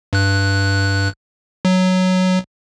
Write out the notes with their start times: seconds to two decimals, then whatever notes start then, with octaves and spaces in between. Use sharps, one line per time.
0.13 G2 F#6
1.65 F#3